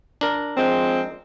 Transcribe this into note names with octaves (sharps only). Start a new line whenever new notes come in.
D4 A#4
F3 G#3 C4